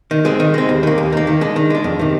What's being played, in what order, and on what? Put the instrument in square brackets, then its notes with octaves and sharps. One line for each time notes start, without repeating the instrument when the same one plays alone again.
[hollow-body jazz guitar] D#3
G#3 C4
D#3
G#3 C4
D#2
D#3 A#3
D#2
D#3 A#3
D#3
G#3 D4
D#3
G#3 D4
F2
C3 D#3